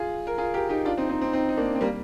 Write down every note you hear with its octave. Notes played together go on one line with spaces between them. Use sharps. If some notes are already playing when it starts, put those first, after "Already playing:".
Already playing: F4 G#4
A#4
F4 G#4
G4 A#4
D#4 G4
D4 F4
C4 D#4
C4 D#4
C4 D#4
C4 D#4
D#4
A#3 D4
C4
G3 A#3